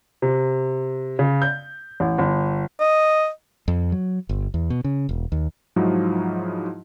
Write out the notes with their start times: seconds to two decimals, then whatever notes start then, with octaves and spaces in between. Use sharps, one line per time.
0.22 C3
1.19 C#3
1.42 G6
2.00 A1
2.19 G1
2.80 D#5
3.68 F2
3.92 F#3
4.29 G1
4.54 E2
4.70 B2
4.84 C#3
5.09 E1
5.32 D#2
5.76 G#2 F3 F#3 D#4 E4 F#4